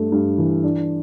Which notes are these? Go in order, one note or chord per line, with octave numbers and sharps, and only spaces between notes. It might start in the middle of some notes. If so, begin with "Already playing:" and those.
Already playing: G2 A3
G2
E3
D4